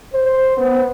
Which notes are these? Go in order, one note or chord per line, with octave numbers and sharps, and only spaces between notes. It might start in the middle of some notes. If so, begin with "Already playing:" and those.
C5
B3